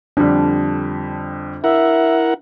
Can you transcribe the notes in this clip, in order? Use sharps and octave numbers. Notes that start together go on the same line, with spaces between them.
F2 D3 G3 D4
E4 A#4 E5 F#5